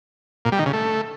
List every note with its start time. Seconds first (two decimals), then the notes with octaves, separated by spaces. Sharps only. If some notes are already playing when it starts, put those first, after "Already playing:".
0.45 A#2
0.52 G3
0.59 D#3
0.66 C#3
0.73 A3